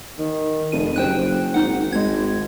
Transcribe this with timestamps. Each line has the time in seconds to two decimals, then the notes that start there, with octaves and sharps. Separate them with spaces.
0.18 D#3
0.72 F1 D#7
0.96 F#1 C5 G5 F#6
1.54 G#1 D#4 F#5
1.93 G#1 G#3 G#6